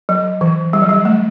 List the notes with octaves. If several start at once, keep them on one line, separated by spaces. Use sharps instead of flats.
F#3
E3
G3
F#3
G3
A3